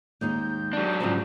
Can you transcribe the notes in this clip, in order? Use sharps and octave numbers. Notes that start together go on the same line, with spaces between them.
D#2 G#3 D#4 G6
F#3 D4
G#2 C#3 F3